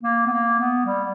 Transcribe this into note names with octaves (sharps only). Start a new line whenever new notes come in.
A#3
B3
A#3
B3
G3